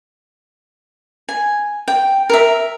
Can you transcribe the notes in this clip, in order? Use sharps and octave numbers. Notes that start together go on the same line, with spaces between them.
G#5
G5
A#4 E5